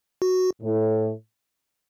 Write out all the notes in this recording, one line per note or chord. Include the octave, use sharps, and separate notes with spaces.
F#4
A2